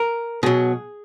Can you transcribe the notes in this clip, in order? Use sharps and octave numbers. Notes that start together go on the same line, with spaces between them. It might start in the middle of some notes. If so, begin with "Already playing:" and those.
Already playing: A#4
B2 F#3 G#4